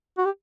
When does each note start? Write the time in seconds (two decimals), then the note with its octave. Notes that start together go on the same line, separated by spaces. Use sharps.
0.18 F#4
0.25 G4